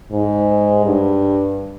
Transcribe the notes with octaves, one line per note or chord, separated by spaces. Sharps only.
G#2
G2